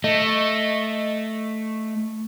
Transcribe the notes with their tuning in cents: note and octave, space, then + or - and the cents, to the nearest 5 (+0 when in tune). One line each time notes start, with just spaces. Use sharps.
A3 +0 D#5 +0